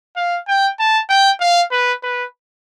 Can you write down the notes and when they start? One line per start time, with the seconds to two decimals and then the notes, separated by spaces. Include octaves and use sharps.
0.17 F5
0.48 G5
0.79 A5
1.09 G5
1.40 F5
1.71 B4
2.03 B4